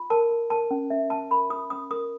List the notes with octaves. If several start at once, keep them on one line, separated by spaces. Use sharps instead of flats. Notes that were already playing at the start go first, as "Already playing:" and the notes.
Already playing: F4
A#4 A5
A#4
A#4 A5
C#4
C#4 E5
C#4 A5
A#4 B5
F4 D#6
C#4 D#6
A#4 D#6